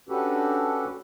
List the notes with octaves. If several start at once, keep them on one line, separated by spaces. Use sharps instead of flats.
C#4 D4 F#4 G4 A4 B4